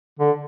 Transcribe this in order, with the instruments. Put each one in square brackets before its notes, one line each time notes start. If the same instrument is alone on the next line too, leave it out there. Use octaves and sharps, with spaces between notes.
[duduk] D3